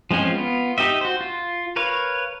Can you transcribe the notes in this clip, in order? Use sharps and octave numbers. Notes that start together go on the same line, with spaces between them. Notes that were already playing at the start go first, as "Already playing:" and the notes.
F3 G#3 C4 C#4 F4
B3 F4
D#4 G4 D#5 E5
F#4 C5
F4
A#4 B4 C#5 F5